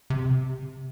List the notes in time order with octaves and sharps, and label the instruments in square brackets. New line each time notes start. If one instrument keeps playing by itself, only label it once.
[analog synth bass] C3